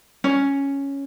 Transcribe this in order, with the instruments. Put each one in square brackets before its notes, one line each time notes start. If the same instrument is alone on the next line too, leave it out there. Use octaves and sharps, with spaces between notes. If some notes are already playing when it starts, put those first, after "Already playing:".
[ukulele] C#4